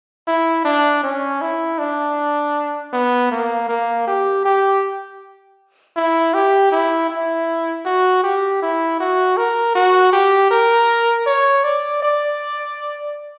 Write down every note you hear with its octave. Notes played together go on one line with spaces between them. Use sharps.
E4
D4
C#4
E4
D4
B3
A#3
A#3
G4
G4
E4
G4
E4
E4
F#4
G4
E4
F#4
A#4
F#4
G4
A#4
C#5
D5
D5